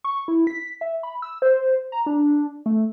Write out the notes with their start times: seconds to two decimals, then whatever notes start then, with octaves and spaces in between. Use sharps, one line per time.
0.04 C#6
0.28 E4
0.47 B6
0.81 E5
1.03 B5
1.22 E6
1.42 C5
1.92 A#5
2.06 D4
2.66 A3